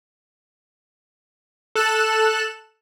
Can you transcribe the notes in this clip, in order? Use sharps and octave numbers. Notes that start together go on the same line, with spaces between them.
A4 F#6 E7